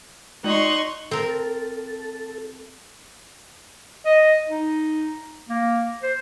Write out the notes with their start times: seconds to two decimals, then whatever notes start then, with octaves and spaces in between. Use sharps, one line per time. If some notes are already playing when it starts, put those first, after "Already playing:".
0.44 G#3 D#4 D5 C6 C#6 F#6
1.11 C4 A4 A#4
4.06 D#5
4.48 D#4
5.49 A#3
6.03 C5